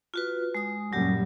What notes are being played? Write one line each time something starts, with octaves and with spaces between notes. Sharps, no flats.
F4 F#4 B4
G#3 D#6
F#2 A#2 F#3 G3 G4